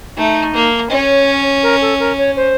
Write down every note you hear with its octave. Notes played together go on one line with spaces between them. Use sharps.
A3 D#4
A#3
C#4 C#5 D#5
A#4
A4
A#4
C#5
C5